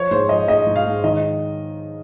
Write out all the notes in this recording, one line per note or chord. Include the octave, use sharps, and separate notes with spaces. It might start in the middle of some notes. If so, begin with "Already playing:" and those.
Already playing: F3 C#5
G#2 C5
F3 D#5
G#2 D#5
G#2
F5
G#2
D#3 D#5